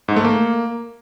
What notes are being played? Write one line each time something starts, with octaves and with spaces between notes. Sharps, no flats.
G#2
A3
A#3